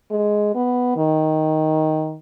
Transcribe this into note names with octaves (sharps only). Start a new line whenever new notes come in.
G#3
B3
D#3